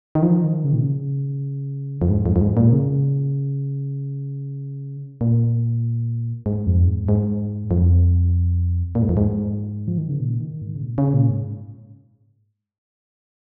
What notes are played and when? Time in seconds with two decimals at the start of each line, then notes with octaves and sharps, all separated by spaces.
0.15 D#3
0.23 F3
0.44 D#3
0.64 C#3
0.73 A#2
0.81 C#3
2.02 F2
2.10 G#2
2.26 F2
2.36 F2
2.41 G#2
2.57 A#2
2.72 C#3
5.21 A#2
6.46 G#2
6.67 F2
6.87 G#2
7.09 G#2
7.71 F2
8.95 A#2
9.02 G#2
9.09 F2
9.17 G#2
9.88 F3
9.98 D#3
10.09 C#3
10.20 A#2
10.41 D#3
10.62 G#2
10.76 C#3
10.82 A#2
10.98 C#3
11.14 A#2
11.29 G#2